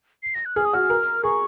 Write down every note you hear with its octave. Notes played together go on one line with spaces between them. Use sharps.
C7
A#6
F#6
G#4 F6
D#6
F#4 F6
A#4
G#4 C#6